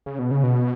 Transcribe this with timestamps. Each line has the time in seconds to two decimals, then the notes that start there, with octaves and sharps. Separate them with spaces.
0.06 C#3
0.19 B2
0.31 C#3
0.43 B2